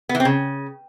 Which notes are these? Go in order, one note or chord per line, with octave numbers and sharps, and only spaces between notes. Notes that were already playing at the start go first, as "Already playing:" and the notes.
B3
E3
C4
C#3